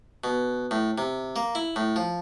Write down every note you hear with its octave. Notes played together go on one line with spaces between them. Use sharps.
B2
A2
C3
A#3
E4
A2
F3